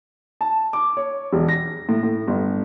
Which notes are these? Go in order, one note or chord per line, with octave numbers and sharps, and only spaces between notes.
A5
D6
C#5
E1
A#6
A2
A2
G1